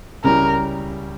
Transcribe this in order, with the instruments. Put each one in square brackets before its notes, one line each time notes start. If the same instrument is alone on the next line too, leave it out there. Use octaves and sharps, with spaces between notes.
[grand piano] C#2 C#3 G3 C#4 E4 [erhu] A#4